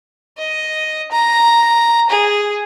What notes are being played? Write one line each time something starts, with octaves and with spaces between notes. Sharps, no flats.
D#5
A#5
G#4